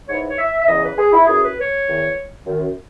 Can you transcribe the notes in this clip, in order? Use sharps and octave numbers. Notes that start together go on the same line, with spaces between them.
G#2 E3 C#5
C#5
E5
E5
E2 C#3 E3 D#5
B4
G#4
E4
F#2 E3 G#4
B4
C#5
E2 D#3
F#2 D#3